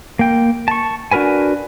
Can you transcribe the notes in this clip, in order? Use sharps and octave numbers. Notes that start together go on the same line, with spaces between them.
A#3 G5
A5 C#6
D4 F#4 A#4 B4 G#5